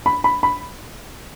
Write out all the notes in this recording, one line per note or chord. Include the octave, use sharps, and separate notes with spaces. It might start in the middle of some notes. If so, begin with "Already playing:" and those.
B5
B5
B5